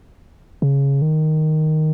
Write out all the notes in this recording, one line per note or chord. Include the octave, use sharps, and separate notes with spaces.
C#3
D#3